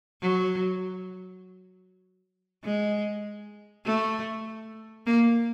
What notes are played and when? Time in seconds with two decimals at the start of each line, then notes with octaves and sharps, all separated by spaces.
0.22 F#3
2.64 G#3
3.85 A3
5.06 A#3